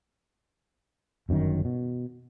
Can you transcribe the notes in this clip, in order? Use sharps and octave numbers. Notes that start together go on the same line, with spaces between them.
G1 F#2 B2 D#3
B2